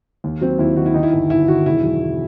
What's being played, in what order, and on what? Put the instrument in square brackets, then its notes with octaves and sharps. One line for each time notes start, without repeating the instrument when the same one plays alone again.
[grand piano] D#2
F#3 C4
D#2 E4
D#3 F#4
E4
D#3 D#4
E4
G1
G1 E4
D#3 F#4
E1 E4
F#3
F#3